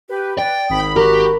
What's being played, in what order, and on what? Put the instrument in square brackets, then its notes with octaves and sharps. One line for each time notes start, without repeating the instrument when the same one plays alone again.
[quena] G4 [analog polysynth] B4
[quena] D5 [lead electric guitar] G5
[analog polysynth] G#1 B5 [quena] D#6
[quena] F#4 [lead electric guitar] G4 [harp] A#4